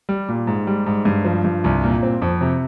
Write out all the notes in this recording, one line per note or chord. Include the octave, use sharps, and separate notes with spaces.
G3
A#2
G#2
G3
G#2
G2
F3
G2
C2
A#2
C4
F2
C3